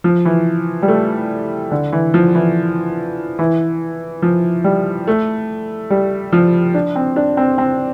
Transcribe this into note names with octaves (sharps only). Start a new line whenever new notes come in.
F3
E3
G3
A3
D3
E3
F3
E3
E3
F3
G3
A3
G3
F3
D4
C4
D4
C4
C4